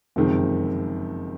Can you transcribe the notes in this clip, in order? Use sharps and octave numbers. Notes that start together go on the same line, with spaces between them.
F#1 F2 C3 D#3 G#3